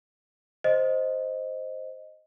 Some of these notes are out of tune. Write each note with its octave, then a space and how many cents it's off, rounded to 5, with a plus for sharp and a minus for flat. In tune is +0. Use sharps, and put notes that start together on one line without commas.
C5 +0 D#5 +0